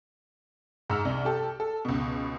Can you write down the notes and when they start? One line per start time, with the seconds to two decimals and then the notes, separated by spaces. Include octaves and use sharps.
0.90 G#2 E6 F6
1.05 C2
1.25 G4 A4
1.60 A4
1.85 C#2 B2